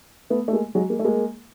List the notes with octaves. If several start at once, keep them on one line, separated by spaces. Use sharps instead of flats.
A3 B3
A3
G#3 A#3
F#3 G#3
G#3 A#3
A3
G#3 A#3